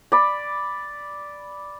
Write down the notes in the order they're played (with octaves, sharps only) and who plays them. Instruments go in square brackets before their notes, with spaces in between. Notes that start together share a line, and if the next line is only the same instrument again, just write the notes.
[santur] D5 B5